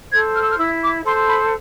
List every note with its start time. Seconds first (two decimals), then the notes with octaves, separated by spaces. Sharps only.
0.11 A4 C5 G#6
0.35 F6
0.42 E6
0.50 F6
0.58 E4 E6
0.82 D6
1.05 A4 C5 C6
1.28 B5